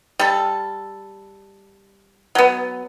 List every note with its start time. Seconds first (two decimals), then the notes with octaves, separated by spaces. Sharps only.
0.19 G3 A4
2.35 F#3 B3